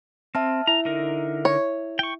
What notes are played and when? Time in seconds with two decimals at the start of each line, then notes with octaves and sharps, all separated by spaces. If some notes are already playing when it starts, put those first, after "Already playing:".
0.35 C4 E5 A5 F6
0.67 E4 E5 A#5
0.85 D3 D#4 A#4
1.45 C#5
1.99 G5 C#6